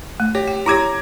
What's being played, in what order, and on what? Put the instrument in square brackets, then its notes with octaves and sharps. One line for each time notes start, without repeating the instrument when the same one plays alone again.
[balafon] A3
[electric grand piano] G4 [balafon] C#5
[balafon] G5
[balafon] E4 G4 C#5 [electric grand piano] A#5 D6 G#6